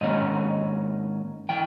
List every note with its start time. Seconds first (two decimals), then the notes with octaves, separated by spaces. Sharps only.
0.01 G#2 D#3 A#3 C#4 D#5
1.49 E3 G5